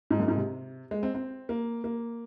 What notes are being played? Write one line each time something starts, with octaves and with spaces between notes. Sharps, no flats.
G#2
F#2
G#2
C3
G#3
C4
C4
A#3
A#3